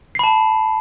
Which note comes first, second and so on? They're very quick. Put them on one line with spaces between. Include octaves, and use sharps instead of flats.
C7 B5 A5